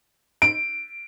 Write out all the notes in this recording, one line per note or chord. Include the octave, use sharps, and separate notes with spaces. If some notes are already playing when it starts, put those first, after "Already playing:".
D7